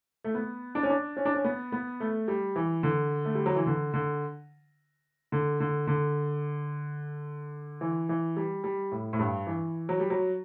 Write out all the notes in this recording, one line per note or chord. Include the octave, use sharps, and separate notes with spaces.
A3
B3
D4
C#4
D4
C#4
D4
C#4
B3
B3
A3
G3
E3
D3
A3
G3
F#3
E3
D3
D3
D3
D3
D3
E3
E3
G3
G3
A2
A2
G2
E3
F#3
G3
F#3